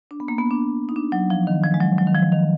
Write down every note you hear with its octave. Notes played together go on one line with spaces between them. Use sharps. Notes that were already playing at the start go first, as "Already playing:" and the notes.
D4
B3
A#3
B3
D4
D#4
D4
F#3
F3
D#3
F3
G#3
F#3
F#3
D#3
F3
D#3